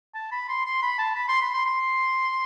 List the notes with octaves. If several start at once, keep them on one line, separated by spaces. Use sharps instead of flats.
A5
B5
C6
C6
B5
A5
B5
C6
B5
C6
C6